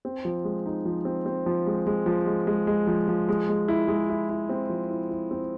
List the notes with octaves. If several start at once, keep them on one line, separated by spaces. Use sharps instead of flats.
C4
F3
G#3
D#4
F3
C4
C4
F3
G#3
G#3
F3
G#3
G#3
G#3
F3
F3
G#3
G#3
E4
G#3
E4
E4
C4
F3
E4
E4
C4